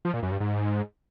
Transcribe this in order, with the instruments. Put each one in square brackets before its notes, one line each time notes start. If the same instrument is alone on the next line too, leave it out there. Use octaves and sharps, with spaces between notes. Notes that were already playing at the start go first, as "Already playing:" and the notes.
[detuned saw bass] F3
A#2
F#2
G2
G#2